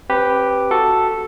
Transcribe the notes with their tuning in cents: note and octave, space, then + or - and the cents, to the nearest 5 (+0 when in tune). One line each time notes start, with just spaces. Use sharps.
C4 +40 G4 +0 B4 +0
F#4 +0 A4 +0